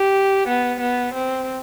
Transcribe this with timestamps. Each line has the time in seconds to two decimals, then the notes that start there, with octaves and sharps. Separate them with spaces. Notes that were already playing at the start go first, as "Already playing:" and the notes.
Already playing: G4
0.48 B3
0.81 B3
1.14 C4